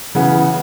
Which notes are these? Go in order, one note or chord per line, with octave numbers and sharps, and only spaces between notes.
C#3 E3 B3 F#5